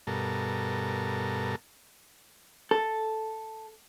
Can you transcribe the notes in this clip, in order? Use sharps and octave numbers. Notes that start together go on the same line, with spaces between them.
G2 B2 A4 A#4
A4